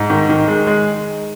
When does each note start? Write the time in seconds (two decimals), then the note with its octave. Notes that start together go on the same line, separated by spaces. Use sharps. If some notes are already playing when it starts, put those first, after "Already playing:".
Already playing: G#2
0.10 D#3
0.29 D#3
0.48 G#3
0.67 G#3